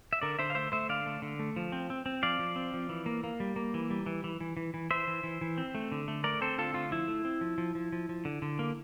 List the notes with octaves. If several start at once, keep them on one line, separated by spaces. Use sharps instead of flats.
E5
D3 A#4 D5
D3 C5 E5
F5
A3 C5 E5
A3 C5 E5
D3 D5 F5
A3
D3
A3
F3
C4
C4
C4
F3 D5 F5
F3
C4
F3
E3
A#3
A#3
G3
A#3
E3
G3
E3
E3
E3
E3
E3
E3 C5 E5
E3
E3
E3
C4
A3
D3
A3
A3 A#4 D5
C4 A4 C5
D3 F4 A4
A3 F4
F3 E4
A3
C4
F3
F3
F3
F3
F3
D3
D3
A#3